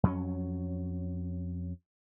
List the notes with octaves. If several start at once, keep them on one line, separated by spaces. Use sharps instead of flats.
F2 F#3 C#4